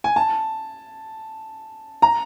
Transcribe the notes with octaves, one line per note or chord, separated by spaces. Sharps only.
G#5
A5
A#5